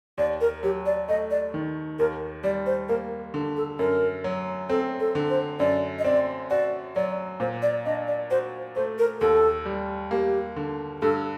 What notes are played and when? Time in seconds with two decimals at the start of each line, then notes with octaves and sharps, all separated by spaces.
0.18 D#2 D5
0.41 A#4
0.63 F#3 G4
0.86 D5
1.09 A3 D#5
1.31 D5
1.54 D#3
1.99 D#2 A#4
2.44 G3 D5
2.66 C5
2.89 A#3 A#4
3.34 D3
3.57 A4
3.79 F#2 A#4
4.24 F#3
4.69 C4 A4
5.00 A4
5.15 D3
5.30 C5
5.60 F#2 D5
5.99 D#5
6.04 C4 D5
6.50 F#4 D5
6.95 F#3 D5
7.40 A#2 C5
7.62 D5
7.86 D4 D#5
8.08 D5
8.31 F#4 C5
8.76 A3 C5
8.99 A#4
9.21 D#2 A4
9.66 G3
10.11 A#3 G4
10.56 D3
11.02 G2 A4